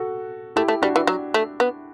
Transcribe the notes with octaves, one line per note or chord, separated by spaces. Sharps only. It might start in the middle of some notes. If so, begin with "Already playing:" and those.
Already playing: F#4 A4
A3 E4 G4
A3
G3 D4 F#4
E3
F#3
A3
B3